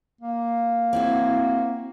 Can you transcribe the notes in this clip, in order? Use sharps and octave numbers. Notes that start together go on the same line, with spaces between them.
A#3
C4 E4 F#4